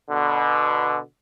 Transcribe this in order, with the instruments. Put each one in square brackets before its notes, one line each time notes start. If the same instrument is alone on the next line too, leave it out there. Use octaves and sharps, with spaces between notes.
[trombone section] B2 D3